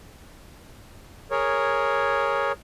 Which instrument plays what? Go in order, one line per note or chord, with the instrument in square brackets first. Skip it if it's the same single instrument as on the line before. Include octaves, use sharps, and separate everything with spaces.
[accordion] G#4 A#4 C#5